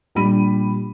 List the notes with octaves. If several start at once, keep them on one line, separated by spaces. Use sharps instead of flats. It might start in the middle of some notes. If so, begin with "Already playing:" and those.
A#1 G3 D4 B5 D#7